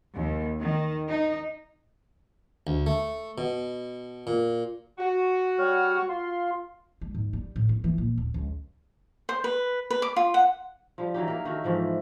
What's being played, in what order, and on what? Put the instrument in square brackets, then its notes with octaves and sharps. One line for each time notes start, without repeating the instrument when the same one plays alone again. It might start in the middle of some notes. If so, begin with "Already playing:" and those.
[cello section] D#2
D#3
D#4
[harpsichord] D2
A3
B2
A#2
[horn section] F#4
[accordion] G3 C#5 F6
F4 C6
[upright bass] G#3
G#2
G3
A2
C3
E3
A#2
D1
C#2
[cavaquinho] C5
B4
B4
D6
F4
F#5
[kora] F3 G3
E3 F#3 D#4 G4
A#3 A#4
D#3 A3 F#4
G#2 E3 F3 A3